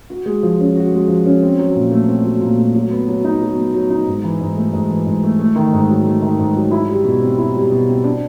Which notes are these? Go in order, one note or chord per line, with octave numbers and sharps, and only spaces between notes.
F#4
G#3
F3
C#4
F#4
G#3
F3
C#4
C4
F#3
A#2
A3
C4
F#3
A#2
A3
F#3
B3
F#3
D#4
F#3
B3
F#3
D#4
G#2
E3
G#2
A3
G#2
E3
G#2
A3
A3
D#3
G#2
F#3
A3
D#3
G#2
F#3
E4
G3
B2
C4
E4
G3
B2
C4
D4